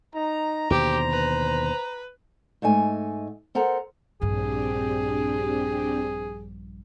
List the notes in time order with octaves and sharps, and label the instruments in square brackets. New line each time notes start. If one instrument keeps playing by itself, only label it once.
[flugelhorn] D#4 [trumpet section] A#5
[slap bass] D#2 B2 D3 [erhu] G4 [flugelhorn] C5
[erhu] B4
[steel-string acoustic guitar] G#2 A3 D#5 G#5
A4 A#4 C5 F#5 A#5
[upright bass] A#1 G2 [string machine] C4 D4 G4 [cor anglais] G#4